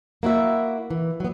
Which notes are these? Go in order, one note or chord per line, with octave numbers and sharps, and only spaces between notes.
A#3 E4 F#4 E5
E3
F#3 B3